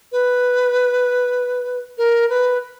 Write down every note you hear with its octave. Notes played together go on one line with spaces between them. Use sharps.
B4
A#4
B4